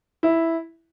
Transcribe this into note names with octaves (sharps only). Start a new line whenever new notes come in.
E4